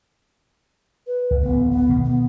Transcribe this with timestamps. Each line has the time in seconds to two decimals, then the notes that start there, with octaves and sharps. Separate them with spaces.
1.07 B4
1.31 C#2
1.43 D1 A1 A3 B3
1.71 B3
1.89 B2 D3 D#3
2.04 B3